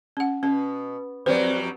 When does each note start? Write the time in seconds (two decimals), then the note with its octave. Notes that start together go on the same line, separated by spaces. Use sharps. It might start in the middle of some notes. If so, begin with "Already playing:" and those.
0.17 C#4 F#5
0.43 B2 C#4
1.26 F2 F#3 G3 C4 B4 C5 D5